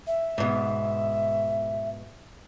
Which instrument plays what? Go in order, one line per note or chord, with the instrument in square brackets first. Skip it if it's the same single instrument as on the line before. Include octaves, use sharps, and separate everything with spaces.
[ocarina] E5
[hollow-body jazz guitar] G#2 B2